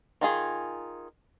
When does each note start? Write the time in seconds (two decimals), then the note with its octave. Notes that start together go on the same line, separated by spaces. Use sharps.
0.21 D#3 F4 G#4